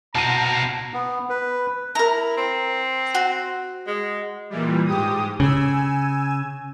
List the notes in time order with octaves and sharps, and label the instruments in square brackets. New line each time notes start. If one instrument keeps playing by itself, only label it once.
[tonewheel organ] B2 F#5 F6 [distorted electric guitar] C4 E4 [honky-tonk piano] A5 D#7 [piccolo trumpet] A#5
[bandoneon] B3
B4
[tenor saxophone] E4 [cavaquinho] A#4 A#5
[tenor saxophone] C4
[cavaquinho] F#4
[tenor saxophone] G#3
[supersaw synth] A#2 E3 G3
G#2 G4 D#6
[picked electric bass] C#3 [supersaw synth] G#5 E6